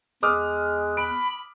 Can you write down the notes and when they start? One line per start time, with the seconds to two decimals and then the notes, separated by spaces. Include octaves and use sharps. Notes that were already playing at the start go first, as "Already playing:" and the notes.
0.23 E2 G#3 D6 D#6 F6 F#6
0.97 B5 D7